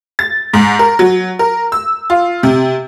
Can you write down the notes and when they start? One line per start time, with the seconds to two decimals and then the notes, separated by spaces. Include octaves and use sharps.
0.19 A6
0.53 G#2
0.79 A#4
0.99 F#3
1.39 A#4
1.72 E6
2.10 F4
2.43 C3